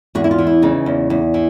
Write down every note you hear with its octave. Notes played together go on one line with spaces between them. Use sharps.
E2 F#4
E4
F4
E3
E4
C#3 D#4
E2
E2
E3